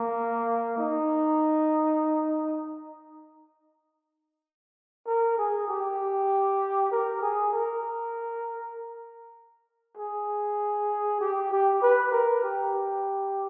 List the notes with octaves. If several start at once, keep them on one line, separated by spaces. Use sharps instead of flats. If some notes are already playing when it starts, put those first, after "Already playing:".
Already playing: A#3
D#4
A#4
G#4
G4
A#4
G#4
A#4
G#4
G4
G4
B4
A#4
G4